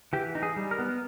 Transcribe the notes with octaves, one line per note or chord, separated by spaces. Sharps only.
E3 G4
D#4
G#4
G3
A#4
B3